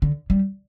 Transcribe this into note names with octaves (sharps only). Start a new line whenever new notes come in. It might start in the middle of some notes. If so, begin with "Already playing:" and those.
D3
G3